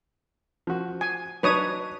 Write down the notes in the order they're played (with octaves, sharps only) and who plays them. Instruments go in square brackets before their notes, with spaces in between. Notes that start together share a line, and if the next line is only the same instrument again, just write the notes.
[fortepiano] F3 F#4
[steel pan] G#5
[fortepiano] F#3 D4 D#4 [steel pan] B4 C#5 D#6